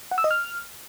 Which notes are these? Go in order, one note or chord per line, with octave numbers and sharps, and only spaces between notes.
F#5
E6
D#5
F6